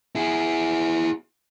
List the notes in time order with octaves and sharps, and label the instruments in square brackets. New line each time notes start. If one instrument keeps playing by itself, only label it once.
[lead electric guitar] E4 G#4